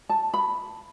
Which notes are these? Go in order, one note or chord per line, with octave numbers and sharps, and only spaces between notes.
A5
B5